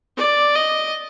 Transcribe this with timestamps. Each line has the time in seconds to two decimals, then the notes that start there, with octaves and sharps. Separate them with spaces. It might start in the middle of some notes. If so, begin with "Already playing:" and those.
0.17 D5
0.55 D#5